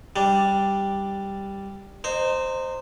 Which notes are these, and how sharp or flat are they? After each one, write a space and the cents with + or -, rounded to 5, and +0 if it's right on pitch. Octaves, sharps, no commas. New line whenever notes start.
G3 +0 D4 +0
D#4 -25 C5 +0